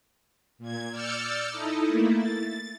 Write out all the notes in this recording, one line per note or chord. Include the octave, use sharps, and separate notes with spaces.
A#2 G#6
D5 E6 F6 G6 A6 C#7
D#4 E4 A4 D#5
A3 A#3 E4
A6